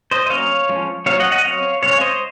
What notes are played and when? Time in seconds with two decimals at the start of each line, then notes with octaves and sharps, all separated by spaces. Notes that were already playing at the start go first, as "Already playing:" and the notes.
0.11 C5 D#5
0.26 D#5
0.30 F#3 A#3 C#4 C#5 F5
0.69 F3 G#3 C#4
1.06 F#3 A#3 C#4 C#5 F5
1.20 D#5 F#5
1.32 D#5 F#5
1.44 F#3 C4 C#5 F5
1.82 C#3 G#3 C4 C#5 F5
1.93 C#5
2.01 C5 D#5